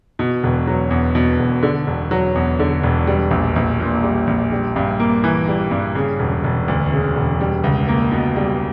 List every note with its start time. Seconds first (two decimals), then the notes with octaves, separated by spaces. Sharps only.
0.19 B2
0.43 E1
0.67 F#3
0.90 E2
1.15 B2
1.39 E1
1.63 D3
1.87 E1
2.11 F#3
2.35 E2
2.59 D3
2.83 E1
3.07 G3
3.31 A#1
3.56 A#1
3.80 A#2
4.03 G3
4.27 A#1
4.52 G3
4.76 G2
4.99 A#3
5.24 E3
5.48 G3
5.71 G2
5.95 C#3
6.19 E1
6.44 E1
6.68 D2
6.92 C#3
7.16 E1
7.41 G3
7.64 C#2
7.88 A#3
8.12 B2
8.36 G3